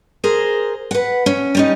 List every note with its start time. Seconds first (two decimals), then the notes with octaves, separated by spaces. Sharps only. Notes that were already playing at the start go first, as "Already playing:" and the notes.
0.24 G#4 A#4 C5
0.91 B4 F#5
1.26 C#4
1.55 G3 C#4 D#4